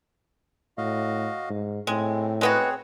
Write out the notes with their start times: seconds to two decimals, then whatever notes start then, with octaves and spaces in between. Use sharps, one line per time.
0.78 A2 F#4 D#5 F5
1.49 G#2
1.87 A2 G#3 C4
2.41 G#3 B3 C4 F#4 G#4 C#5